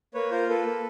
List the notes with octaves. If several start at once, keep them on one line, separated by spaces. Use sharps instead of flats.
A#3 B4 C#5
F4 A#4 C5
A#3 A4 B4
A#3